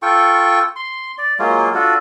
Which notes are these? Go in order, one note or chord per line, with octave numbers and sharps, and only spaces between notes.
F4 A4 G5 C#6
C6
D5
F#3 G#3 A#3 F4
D4 F4 F#4 A4